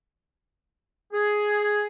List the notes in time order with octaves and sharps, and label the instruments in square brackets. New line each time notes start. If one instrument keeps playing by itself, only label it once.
[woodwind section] G#4